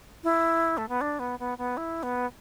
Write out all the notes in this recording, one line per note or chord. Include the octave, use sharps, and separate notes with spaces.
E4
A3
B3
D4
B3
B3
B3
E4
B3